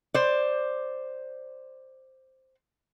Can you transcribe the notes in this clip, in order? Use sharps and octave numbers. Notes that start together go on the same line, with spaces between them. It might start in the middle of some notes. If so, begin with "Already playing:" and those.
C5 D5